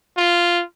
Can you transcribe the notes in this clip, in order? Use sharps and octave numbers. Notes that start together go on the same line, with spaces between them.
F4